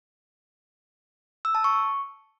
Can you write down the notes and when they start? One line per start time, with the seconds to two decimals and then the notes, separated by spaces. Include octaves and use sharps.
1.45 E6
1.55 A5
1.64 C#6